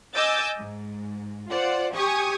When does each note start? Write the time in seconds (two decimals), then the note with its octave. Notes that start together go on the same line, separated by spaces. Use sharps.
0.15 D#5 G#5 D6 E6 G6 A6
0.58 G#2
1.50 F4 C5 D5 F#5
1.94 G4 G#5 C#6 D#6